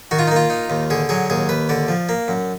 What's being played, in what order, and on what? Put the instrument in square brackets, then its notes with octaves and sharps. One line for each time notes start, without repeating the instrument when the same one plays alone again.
[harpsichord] D#3 F#4
F4
D#4
A#3 F4
D#4
D#2
D3 G#4
F#3 G#4
D#2 G#4
D#2 B4
D3 D5
F3
A#3
F#2